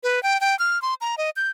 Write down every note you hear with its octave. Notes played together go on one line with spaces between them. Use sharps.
B4
G5
G5
F6
C6
A#5
D#5
G6